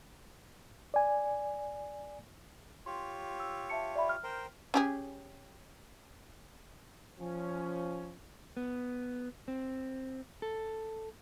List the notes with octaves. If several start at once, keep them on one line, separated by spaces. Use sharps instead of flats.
D5 G#5
F4 G4 C#5 C6
E6
E5 A5 C#7
D5 E5 B5
F6
A#4 C5 G5
C#4 G4 G#4
F3 C#4
B3
C4
A4